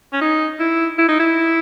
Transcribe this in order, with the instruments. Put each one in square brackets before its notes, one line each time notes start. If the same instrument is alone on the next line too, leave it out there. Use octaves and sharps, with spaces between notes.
[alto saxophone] C#4
D#4
E4
E4
D#4
E4